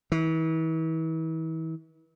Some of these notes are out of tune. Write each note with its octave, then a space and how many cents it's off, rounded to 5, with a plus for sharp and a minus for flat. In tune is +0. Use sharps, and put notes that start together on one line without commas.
E3 -40